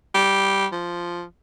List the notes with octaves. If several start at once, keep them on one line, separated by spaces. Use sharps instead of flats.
G3
F3